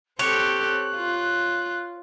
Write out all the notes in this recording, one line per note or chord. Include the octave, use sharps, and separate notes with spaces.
C4 G4 A4 C#5 F#6
F4